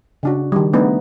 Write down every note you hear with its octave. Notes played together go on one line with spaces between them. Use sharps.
C#3 D4 F#4
D#3 G3
G3 A3 B3 D4 D#4